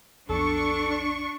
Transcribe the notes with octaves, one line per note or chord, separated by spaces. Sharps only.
B1 F2 B2 D4 A4 C#6